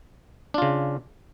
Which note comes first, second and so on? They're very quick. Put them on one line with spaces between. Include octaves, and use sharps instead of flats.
D4 F4 C#3